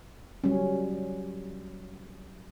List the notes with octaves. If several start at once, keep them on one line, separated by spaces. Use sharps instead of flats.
F#3 G3 C#4